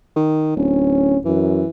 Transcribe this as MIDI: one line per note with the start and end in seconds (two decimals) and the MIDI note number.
0.16 0.53 51
0.57 1.17 26
0.57 1.18 61
1.25 1.63 42
1.25 1.69 52